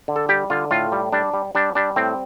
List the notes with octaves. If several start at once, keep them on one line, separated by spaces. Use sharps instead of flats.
D3
A4
G3 G4
D3 F4
A2 F4
G3
G3 D4
G3
G3 D4
G3 D4
A2 C4